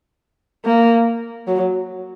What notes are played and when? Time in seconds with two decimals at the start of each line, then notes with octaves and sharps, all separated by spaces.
0.65 A#3
1.47 F#3